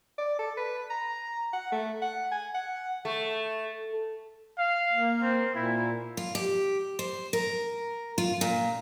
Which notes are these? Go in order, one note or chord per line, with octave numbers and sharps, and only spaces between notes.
D5
A4
B4
A#5
F#5
A3
F#5
G#5
F#5
A3
F5
A#3
C4
A#2 E4
F4
G4
C5
A#4
F4
A#2